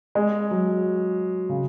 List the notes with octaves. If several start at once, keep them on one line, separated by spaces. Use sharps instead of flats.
G#3
F#3
C#3